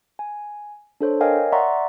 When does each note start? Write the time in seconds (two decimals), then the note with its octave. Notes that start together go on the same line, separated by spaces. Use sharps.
0.19 G#5
1.01 D4 A4 C5 C#5
1.21 A#4 C#5 D#5 F5 G5 G#5
1.52 D5 E5 F#5 A#5 C6 C#6